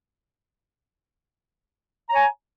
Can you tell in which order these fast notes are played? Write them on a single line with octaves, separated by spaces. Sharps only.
A#5 C#5 G#5